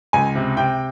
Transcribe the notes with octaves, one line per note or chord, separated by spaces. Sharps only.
C#2 G#5
C3
C3 G5